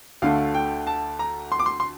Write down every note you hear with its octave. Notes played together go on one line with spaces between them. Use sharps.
D2 D3 A3 F5
G5
A5
A#5
C6
D6
C6
C6